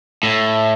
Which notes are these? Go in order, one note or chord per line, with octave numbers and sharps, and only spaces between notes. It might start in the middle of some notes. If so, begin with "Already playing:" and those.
A2